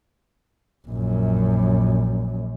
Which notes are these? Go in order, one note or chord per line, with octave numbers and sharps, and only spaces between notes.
A#1 F#2